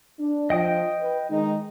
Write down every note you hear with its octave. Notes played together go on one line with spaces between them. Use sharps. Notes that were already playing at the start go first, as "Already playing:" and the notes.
D4
F3 D#5 G5 D#6
B4
D#3 G#3 D#4